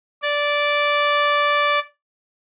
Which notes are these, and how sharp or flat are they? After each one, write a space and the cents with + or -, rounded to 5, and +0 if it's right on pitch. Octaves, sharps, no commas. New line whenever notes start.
D5 -10